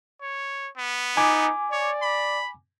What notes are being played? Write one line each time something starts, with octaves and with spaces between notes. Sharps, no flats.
C#5
B3
D#4 G#5 D6
C#5 D5
B5